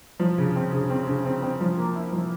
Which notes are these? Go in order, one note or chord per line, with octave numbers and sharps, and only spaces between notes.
F3
C#3
C4
C#3
C4
C#3
C4
C4
F3
A#3
E4
F3